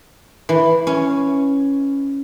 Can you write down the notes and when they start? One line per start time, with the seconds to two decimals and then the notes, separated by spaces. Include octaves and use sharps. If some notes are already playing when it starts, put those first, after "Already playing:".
0.49 E3
0.87 C#4